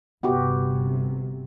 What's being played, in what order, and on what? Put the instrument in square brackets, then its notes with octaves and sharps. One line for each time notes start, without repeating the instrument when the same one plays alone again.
[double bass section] G1 C3 [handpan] B3 F#4 G4